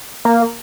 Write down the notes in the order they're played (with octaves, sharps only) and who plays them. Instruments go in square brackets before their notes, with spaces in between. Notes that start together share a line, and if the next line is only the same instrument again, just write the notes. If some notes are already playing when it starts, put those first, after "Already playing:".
[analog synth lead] A#3